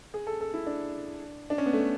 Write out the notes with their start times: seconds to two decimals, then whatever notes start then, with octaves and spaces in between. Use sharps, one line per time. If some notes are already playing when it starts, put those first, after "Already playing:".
0.14 G#4
0.27 A4
0.41 A4
0.54 E4
0.67 D4
1.50 D4
1.58 C#4
1.66 B3
1.73 A3